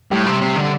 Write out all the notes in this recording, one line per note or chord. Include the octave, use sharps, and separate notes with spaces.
A2 G3 G4
C3
C3
D3